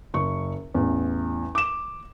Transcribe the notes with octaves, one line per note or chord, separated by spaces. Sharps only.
F#1 C#6
A1 E2
D6 E7